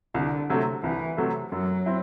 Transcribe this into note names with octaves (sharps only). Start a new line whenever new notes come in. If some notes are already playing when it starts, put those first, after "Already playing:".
C2 D3
C3 F#3 A3
C2 E3
C3 F#3 A3
F#2 F#3
C4 E4